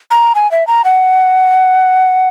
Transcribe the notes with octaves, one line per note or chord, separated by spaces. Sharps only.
A#5
G#5
E5
A#5
F#5